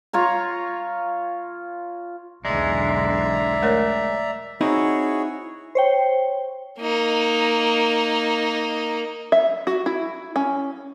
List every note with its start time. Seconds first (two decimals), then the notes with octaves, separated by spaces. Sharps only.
0.13 F4 C#5 A#5
2.45 B1 E2 D3 G#3 D5 E5 A#5
3.63 A3 A#4 C#5
4.61 C4 D#4 E4 F#4 G#4 C#5
5.75 C5 C#5 G5
6.79 A#3 D#4
9.32 E5
9.67 F#4
9.86 E4
10.36 C#4